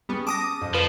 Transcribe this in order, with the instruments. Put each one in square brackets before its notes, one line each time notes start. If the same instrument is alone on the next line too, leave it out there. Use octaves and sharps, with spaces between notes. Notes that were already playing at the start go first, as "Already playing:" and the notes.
[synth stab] G3 B3 [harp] C#4 G#4
[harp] A5 [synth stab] D6 D#6 A#6
[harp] F2
[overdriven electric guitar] F3 [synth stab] B4